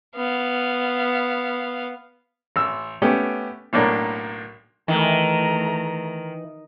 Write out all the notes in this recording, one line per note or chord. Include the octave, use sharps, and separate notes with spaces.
B3 F5
A1 E6
A3 B3 C#4 G4 G5
B1 A2 A#3 D4 C#5
D#3 E3 A3 A#5